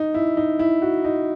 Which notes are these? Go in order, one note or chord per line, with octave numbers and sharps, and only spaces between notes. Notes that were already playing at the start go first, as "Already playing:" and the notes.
Already playing: D#4
E4
D#4
E4
F#4
D#4